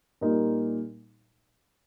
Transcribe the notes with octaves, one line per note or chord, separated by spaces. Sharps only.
A#2 G3 A#3 D#4